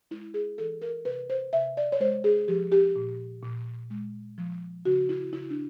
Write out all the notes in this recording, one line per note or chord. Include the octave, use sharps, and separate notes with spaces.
G#3 E4
G#4
E3 A4
A#4
C3 B4
C5
C3 E5
D5
C#5
G#3 C5
G#4
F3 G4
G4
A#2
A#2
G#3
F3
C#3 F#4
E4
C#3 E4
D4